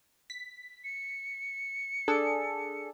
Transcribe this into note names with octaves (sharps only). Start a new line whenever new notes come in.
B6
C#7
D4 G#4 A4